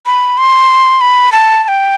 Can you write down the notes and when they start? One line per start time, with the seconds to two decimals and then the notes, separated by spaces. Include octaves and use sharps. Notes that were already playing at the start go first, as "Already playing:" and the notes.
0.06 B5
0.38 C6
1.01 B5
1.32 A5
1.64 A5
1.68 G5